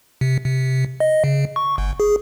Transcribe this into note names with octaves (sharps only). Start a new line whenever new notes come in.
C3
C3
D#5
C#3
C#6
G1
G#4